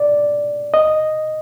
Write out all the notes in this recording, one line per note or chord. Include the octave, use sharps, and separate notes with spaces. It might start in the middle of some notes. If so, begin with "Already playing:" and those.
Already playing: D5
D#5